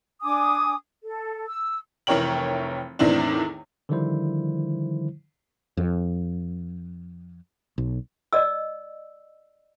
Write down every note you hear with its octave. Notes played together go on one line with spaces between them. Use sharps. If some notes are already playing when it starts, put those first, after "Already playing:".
D4 G#5 D6 D#6
A4
E6
F1 E3 A#4 C#5 G5 F#7
E2 A2 D#3 E3 C4 D4
D3 D#3 F3 G3 E4 C5
F2
B1
D5 D#5 E6